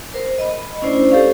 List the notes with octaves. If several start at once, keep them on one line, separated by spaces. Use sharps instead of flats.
A#4 C5
D#5 B5
A3 C#4 D4 E4 C5 D5
G4 A4 C5 F5 C#6